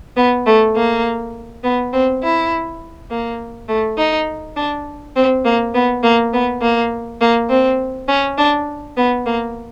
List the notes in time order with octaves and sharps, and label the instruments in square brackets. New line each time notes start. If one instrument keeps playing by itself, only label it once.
[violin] B3
A3
A#3
B3
C4
E4
A#3
A3
D#4
D4
C4
A#3
B3
A#3
B3
A#3
A#3
C4
C#4
D4
B3
A#3